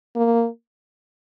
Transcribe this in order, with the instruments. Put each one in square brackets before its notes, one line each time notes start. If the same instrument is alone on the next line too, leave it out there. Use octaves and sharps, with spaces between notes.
[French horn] A#3